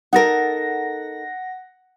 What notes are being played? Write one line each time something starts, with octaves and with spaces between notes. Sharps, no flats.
D#4 A4 A#4 F#5 A#6